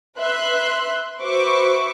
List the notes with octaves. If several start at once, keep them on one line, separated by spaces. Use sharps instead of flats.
B4 E5 C6 F#6
F#4 B4 C5 E5 C#6 D6